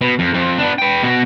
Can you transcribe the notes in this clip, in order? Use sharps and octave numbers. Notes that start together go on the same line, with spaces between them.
B2
F2
F2
B3 D4
B4 G5
B2 F#4